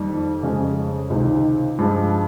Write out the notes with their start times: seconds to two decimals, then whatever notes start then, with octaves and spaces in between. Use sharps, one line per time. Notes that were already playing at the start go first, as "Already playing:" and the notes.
Already playing: F2 D#3 G3 A#3
0.43 F2 C#3 G#3 C#4
1.10 C#2 C3 D#3
1.79 G2 F3 G#3